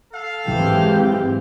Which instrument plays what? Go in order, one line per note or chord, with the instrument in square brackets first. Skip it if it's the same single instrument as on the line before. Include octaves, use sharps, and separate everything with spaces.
[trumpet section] A4 F5
[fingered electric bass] G#2 F#3 [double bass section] E3 G#3 C4 [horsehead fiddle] G4